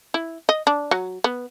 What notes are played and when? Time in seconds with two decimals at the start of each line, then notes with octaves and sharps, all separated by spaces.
0.14 E4
0.49 D#5
0.67 D4
0.91 F#3
1.24 B3